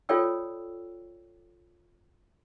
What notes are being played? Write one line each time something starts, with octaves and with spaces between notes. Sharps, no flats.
F4 A4 C#5 D5 G5 E6